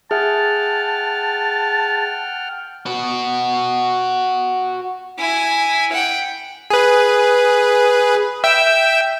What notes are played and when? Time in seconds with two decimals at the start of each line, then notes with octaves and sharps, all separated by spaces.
0.11 G#4 E5 F#5 G5 A5 F6
2.86 F#4 B4
5.18 E4 G#5
5.92 F#5 G5
6.70 G#4 B4
8.44 E5 G5 E6